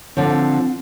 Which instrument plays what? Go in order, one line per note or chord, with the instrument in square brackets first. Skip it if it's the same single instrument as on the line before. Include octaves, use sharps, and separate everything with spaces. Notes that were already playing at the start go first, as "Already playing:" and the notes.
[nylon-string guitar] D3 F3 [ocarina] C4